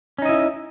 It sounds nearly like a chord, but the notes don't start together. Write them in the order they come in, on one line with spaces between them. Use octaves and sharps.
C#4 D#4 D#5 E4